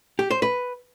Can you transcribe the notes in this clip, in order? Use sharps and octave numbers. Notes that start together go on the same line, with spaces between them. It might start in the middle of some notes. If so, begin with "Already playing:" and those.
G4
C5
B4